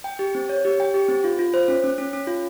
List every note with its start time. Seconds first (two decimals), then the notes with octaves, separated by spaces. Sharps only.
0.04 G5
0.19 G4
0.35 C4
0.49 C#5
0.65 G4
0.80 G5
0.94 G4
1.08 C4
1.24 F4
1.39 F4
1.54 C5
1.68 C#4
1.84 C#4
1.98 C#4
2.13 C#4
2.27 F4